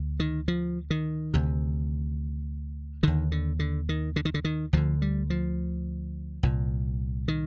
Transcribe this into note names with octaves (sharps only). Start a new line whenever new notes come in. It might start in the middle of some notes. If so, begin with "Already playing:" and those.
Already playing: D2
D#3
F3
D#3
D2 C3
D#2 D3 D#3
D3
D3
D#3
D3
D#3
D3
D#3
D2 D3 F3
G3
F3
C2 A#2
D#3